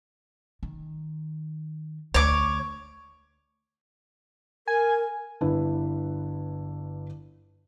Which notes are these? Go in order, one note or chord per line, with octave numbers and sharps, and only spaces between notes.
D#3
D2 C#5 D6
A#4 G#5
G1 D4 E4 B4